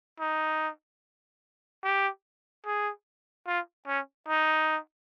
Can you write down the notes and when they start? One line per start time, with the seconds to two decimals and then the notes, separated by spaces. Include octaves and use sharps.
0.20 D#4
1.84 G4
2.66 G#4
3.47 F4
3.87 C#4
4.28 D#4